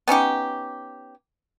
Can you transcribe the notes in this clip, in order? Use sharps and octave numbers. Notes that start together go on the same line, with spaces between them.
B3 C#4 D#4 G4